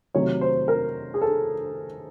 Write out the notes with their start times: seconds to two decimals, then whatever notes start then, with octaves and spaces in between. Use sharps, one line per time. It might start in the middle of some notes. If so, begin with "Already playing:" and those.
0.14 C3 D#3 F#3 A3 C#5
0.41 C5
0.68 A#4
1.14 G#4
1.21 A4